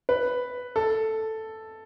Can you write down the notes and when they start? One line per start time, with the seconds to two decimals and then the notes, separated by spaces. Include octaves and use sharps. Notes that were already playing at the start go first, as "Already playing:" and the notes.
0.09 B4
0.76 A4